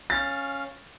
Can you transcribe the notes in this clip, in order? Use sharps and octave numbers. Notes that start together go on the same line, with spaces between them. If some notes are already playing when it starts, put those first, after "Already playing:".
C#4 F5 A6